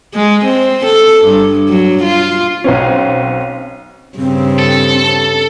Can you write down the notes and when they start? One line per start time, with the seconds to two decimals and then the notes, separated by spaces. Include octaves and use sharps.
0.14 G#3
0.45 C4
0.85 A4
1.25 G2
1.68 F#3
2.03 F4
2.64 B1 C4 C#4
4.18 G2 C#3 C4
4.59 A4